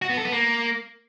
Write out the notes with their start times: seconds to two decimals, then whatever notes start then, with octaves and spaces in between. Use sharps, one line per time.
0.02 F#4
0.09 B3
0.17 A4
0.25 B3
0.32 A#3